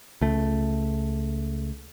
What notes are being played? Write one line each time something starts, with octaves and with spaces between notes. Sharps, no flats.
C#2 A3